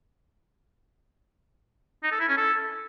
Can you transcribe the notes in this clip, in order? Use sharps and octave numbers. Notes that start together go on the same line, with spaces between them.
D#4
A4
E4
C#4
A4